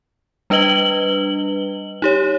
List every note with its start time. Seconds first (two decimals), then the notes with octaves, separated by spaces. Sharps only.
0.50 G3 D4 B4 D#5 F#7 G7
2.02 D#4 G4 C#5